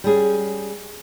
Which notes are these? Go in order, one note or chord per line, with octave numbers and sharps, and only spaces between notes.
G3 C#4 G#4